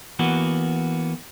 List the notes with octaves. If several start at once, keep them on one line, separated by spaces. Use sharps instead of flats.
E3 A#3 B3 F#4